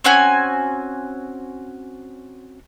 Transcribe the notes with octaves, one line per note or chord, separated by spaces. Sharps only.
C4 C#4 F#4 G#5